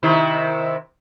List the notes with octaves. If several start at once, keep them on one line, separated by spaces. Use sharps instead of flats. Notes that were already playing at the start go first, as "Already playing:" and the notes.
C3 D#3 E4